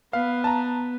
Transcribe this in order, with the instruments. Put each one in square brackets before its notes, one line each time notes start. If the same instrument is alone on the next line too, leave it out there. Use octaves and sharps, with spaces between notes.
[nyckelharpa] B3 [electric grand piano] F5
[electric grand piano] A5 A#5